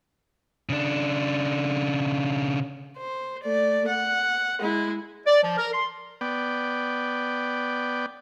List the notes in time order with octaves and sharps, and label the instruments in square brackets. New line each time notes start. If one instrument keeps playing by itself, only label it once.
[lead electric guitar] C#3 D4
[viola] C5
A3 D5
F#5
G#3 E4
[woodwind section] D5
F3
A#4
C6
[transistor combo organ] B3 D5 G5